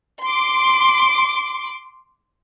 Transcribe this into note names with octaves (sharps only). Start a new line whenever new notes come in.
C6 D6